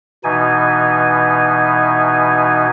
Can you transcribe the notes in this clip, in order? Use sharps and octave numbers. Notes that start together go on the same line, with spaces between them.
B2 E3 D#4 G#5